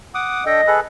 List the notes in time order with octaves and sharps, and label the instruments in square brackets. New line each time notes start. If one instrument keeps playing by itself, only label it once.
[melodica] F#5 D6 D#6
[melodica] D4 A4 G5 [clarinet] D#5
[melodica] G#4 A4 B4